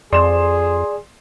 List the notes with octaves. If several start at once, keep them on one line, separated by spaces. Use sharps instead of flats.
F2 G#4 D5 C6 E7